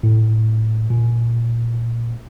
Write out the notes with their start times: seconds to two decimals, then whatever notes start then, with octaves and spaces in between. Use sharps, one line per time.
0.03 A2
0.90 A#2